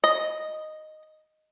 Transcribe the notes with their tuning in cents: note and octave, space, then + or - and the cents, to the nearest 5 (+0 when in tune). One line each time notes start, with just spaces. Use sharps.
D#5 -5